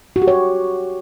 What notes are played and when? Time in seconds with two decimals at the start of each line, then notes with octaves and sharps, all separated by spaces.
0.16 F#4
0.22 G4
0.28 C#5